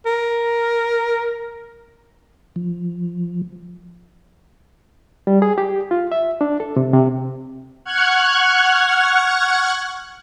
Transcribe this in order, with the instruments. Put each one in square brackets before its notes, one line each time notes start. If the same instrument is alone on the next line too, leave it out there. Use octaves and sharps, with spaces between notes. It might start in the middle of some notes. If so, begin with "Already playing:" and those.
[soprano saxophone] A#4
[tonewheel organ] F3
[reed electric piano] G3
G#4
G4
F4
E5
D4
A4
C3
C3
[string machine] F#5 C#6 F6 F#6 G#6